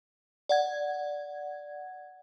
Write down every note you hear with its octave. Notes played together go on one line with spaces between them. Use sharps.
D5 F#5 G#6